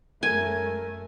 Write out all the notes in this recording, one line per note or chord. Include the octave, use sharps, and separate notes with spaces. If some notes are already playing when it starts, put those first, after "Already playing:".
F#2 G#3 A3 A#4 G#5